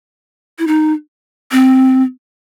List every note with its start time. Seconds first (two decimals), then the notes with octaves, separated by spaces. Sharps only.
0.59 E4
0.67 D#4
1.52 C4